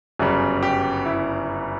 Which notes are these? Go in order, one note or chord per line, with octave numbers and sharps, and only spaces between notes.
G1 F#2 C#3 G3
G4
E4